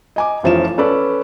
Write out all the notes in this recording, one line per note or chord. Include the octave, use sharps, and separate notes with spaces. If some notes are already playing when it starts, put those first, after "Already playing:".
D#5 G#5 D6
F1 E3 F3 C#4 E7
C#4 A4 B4 D5